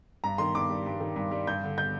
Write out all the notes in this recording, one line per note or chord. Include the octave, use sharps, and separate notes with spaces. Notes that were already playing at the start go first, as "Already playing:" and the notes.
G2 A#5
D#3 C6
G2 D6
G3
G2
D#3
G2
G3
G2 G6
D3
G6